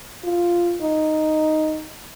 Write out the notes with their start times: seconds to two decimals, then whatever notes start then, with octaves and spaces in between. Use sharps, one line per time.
0.24 F4
0.82 D#4